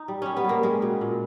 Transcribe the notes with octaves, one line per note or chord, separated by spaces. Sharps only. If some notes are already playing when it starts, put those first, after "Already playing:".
Already playing: D#4
G3
G3 C#4
B3
G3 A#3
G3 G#3
B2
A#2